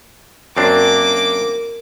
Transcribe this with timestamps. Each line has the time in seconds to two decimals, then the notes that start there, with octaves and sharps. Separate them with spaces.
0.57 F#2 A#3 C4 D4 D6